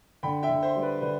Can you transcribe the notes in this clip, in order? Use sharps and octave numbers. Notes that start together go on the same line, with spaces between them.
D3 G5 B5
E5 G5
D3
C5 E5
G3
B4 D5
D3 B4 D5